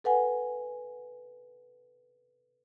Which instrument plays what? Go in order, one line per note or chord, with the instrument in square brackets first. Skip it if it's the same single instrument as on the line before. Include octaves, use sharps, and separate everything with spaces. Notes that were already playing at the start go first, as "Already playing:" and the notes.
[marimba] A4 B4 F#5 G#5